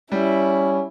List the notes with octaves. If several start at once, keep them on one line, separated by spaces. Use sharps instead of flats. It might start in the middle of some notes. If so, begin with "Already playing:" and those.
G3 C#4 E4